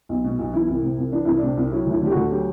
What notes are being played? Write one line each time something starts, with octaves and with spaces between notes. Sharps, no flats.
B1
B2
B1
E3 E4
C2
C3
C2
E3 D4
C2 E4
C3 D4
C2
F#3 E4
D2 E4
D3 G4
D2 F#4
F#3 G4